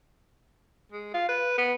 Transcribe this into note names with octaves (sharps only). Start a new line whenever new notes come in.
G#3
F4
B4
B3